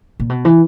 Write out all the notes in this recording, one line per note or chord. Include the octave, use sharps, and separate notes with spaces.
A#2
B2
E3